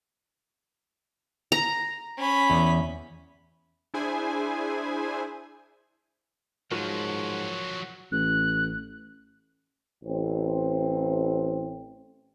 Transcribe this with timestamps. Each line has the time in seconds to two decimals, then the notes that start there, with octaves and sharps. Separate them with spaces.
1.52 A#5
2.18 C#4 B5
2.50 E2
3.94 D4 E4 G#4 C5 G#5
6.72 G#2 F3 F#3 F4 F#4 A#4 C#5 F#5
8.12 A1 F#6
10.04 A1 C4